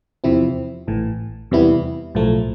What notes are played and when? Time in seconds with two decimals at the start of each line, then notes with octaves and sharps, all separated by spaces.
0.24 E2 C3 F3 C4 E4
0.88 A1 A2 E3
1.51 E2 C3 G3 B3 E4
2.15 B1 A2 F3 A3